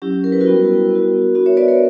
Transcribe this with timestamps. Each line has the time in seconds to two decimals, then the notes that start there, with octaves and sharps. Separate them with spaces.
0.02 F#3 C#4 E4 G4
0.24 A#4
0.32 B4
0.41 F#4 A#4
0.46 G3 B3 E4
0.90 B3 F#4
1.35 B3 D4 F#4
1.46 C#5 E5
1.57 B4 D5
1.68 A#4 C#5